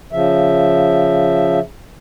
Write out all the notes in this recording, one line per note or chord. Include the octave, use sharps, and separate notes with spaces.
C#3 F3 E5